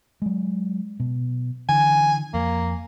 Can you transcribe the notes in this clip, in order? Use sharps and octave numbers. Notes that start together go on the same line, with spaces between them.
F#3 G#3
B2
D3 E3 G#5
F2 A#3